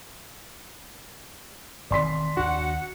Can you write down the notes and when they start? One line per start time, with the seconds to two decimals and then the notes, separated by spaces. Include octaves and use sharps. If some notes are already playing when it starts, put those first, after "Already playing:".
1.91 E1 D#3 C4 D5 C6 B6
2.37 D#2 D4 F#4 F#5